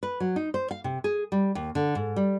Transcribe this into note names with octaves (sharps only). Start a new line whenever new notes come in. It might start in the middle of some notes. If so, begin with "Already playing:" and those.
B4
F#3
D#4
C5
F5
C3
G#4
G3
D#2
D3
G#2
G3